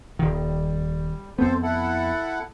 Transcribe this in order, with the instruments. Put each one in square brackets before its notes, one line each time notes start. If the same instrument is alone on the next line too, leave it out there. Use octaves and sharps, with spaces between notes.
[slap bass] D#1 D#3 [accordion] G3
[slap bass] F2 B3 [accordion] C4 A4 C5
[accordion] E4 A4 F#5